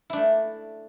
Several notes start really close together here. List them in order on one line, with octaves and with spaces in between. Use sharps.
E4 D4 A3